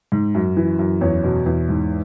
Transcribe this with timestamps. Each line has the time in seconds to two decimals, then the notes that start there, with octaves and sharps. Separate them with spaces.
0.12 G#2
0.35 F#2
0.57 E3
0.79 F#2
1.01 E2 C#5
1.24 B2
1.46 E2
1.69 G#2